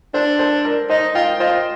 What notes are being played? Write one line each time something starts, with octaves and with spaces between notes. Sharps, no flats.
D4 A4 C5
A4 C5
A#4 D5
D#4 C5 D#5
F4 D#5 G5
F4 C5 D#5